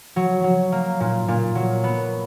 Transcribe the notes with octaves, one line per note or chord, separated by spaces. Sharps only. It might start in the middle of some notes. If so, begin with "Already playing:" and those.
F#3
F#3
A#3
A#2
A#2
F#3
B3